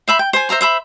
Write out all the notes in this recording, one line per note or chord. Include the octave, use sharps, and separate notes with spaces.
C5 E5 B5 C6
G5
C5 G#5
C5 E5 A#5 C6
C5 E5 B5